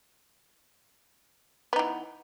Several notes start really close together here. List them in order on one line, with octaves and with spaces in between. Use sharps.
B3 D#4 E3